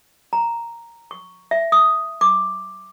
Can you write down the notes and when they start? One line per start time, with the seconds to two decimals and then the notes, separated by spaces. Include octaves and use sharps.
0.33 A#5
1.11 C#6
1.51 E5
1.72 D#6
2.21 D6